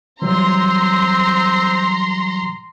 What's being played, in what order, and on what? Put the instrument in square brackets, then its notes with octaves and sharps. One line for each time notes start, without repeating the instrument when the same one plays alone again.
[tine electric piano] E3 F#3 G3 [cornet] C4 [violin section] A#5 C6